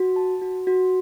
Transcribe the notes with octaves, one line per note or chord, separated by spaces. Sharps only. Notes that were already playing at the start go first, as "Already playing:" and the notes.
Already playing: F#4
A5
F#4
F#4